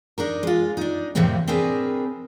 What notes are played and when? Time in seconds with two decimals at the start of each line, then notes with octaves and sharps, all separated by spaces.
0.18 D4 D#4 A#4
0.43 G#3 F4
0.77 D4 D#4
1.15 F2 A2 C3 E3 A#3 C4
1.48 C4 D4 G#4 A#4 B4